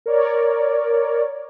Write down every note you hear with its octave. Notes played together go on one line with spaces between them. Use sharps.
A#4 C#5 D5